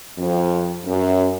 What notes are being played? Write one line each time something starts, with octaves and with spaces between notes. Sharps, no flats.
F2
F#2